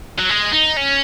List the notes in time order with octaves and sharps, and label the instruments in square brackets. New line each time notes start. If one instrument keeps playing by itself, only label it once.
[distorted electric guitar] F#3
G#3
D#4
C#4